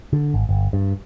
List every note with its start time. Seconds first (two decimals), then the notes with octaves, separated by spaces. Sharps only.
0.13 D3
0.34 G#1
0.49 G1
0.73 G2